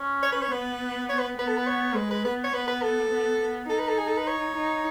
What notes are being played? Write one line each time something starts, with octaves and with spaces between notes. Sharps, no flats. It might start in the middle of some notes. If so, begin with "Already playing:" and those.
Already playing: C#4
C#5
B4
C#5
B3 B4
C#5
B4
B3 B4
A4
B4
C#5
G#3 B4
B4
B3 B4
C#5
B3 B4
B4
A4
B3
B3
D#4 A4
B4
A4
G#4
A4
B4
C#5
D#4